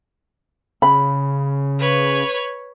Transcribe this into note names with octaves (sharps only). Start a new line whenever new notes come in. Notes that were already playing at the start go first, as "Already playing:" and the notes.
C#3 B5
B4 C#5